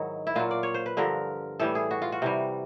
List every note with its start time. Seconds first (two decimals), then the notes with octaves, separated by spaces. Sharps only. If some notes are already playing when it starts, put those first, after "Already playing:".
Already playing: G#2 D#3 F#3 E4
0.27 E4
0.36 A#2 F#3 F4
0.51 D5
0.63 C#5
0.74 C5
0.86 B4
0.97 G2 D3 F3 A#4
1.59 A2 E3 G3 A4
1.75 G#4
1.91 F#4
2.02 F4
2.12 F#4
2.22 C3 E3 G3